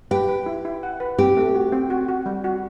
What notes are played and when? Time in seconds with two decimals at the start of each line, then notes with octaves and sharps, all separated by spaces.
0.11 G4 B4
0.28 B4
0.46 E4
0.65 E4
0.83 F#5
1.00 B4
1.19 C4 G4
1.37 A3
1.55 F#4
1.72 C4
1.90 F#4
2.08 F#4
2.26 G3
2.44 F#4